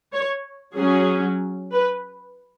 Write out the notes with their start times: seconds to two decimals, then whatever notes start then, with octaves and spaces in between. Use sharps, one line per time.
0.13 C#5
0.77 F#3 C#4 G#4
1.73 B4